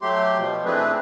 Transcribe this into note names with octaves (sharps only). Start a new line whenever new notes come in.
F#3 A3 G4 C6
B2 F3
E3 A3 C4 D4 G#4 B4